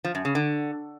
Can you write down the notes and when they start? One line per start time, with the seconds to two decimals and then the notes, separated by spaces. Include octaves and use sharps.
0.05 F3
0.15 F#2
0.25 C#3
0.35 D3